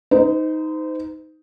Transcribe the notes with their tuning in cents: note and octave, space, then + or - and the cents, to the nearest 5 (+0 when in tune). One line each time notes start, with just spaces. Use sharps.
D#4 +10 C5 -35